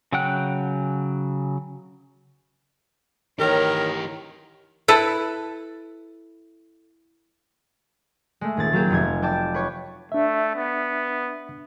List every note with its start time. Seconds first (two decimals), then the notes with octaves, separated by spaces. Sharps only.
0.12 C#3 F#3 F#5 G5 F#6
3.40 D#3 E3 G4 A#4 C#5
4.88 E4 A4 B4
8.41 G#3 A3
8.57 D#1 G#4 A6
8.73 F#3 A#3 G4 G#4
8.90 F1 A3 G#6
9.22 D5 G5 A5 D6
9.54 B4 C#5
10.12 A3 D4 E5
10.56 B3